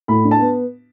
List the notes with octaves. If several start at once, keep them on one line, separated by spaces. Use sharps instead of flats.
A2 B5
D4
A5
B3